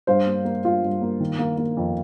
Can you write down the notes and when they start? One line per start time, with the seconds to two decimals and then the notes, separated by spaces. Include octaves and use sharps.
0.07 G2 C5 F5
0.26 A#3
0.45 A#3
0.65 G2 F4
0.83 G2
1.02 A#3
1.20 D#3
1.39 A#3
1.58 A#3
1.77 F2